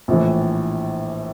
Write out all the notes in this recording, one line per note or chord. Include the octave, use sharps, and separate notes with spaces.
A#1 A2 E3